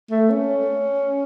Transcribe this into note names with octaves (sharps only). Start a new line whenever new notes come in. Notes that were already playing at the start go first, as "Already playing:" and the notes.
A3
C#4